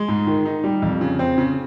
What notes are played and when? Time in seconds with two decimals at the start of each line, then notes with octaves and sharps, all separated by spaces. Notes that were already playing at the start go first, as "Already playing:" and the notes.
Already playing: G#3
0.08 G#2
0.27 D#3
0.46 D#4
0.64 G3
0.82 F2
1.01 C#3
1.19 C4
1.38 C#3